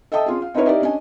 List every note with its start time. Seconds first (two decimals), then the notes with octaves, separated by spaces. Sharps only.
0.12 A4 D#5 E5 G5 A5 D#6
0.26 C#4 F4 G#4
0.42 F5
0.54 C4 D#4 E4 A#4 B4 C#5
0.66 D#4 E4 G4 A#4 D5
0.82 C#4 D4 D#5 G#5